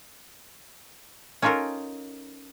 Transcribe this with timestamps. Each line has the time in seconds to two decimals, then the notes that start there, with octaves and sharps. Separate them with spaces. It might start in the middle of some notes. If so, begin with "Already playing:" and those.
1.42 C#4 D#4 F4 A4 A#4